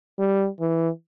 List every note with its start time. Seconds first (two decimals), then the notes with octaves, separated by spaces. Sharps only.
0.19 G3
0.60 E3